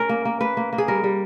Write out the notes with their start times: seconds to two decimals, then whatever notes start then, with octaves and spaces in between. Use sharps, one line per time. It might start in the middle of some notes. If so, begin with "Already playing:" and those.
Already playing: C#4 A#4
0.09 A#3
0.25 A#3
0.41 A#3 B4
0.57 A#3
0.73 A#3
0.78 G#4
0.88 G3 A#4
1.04 G3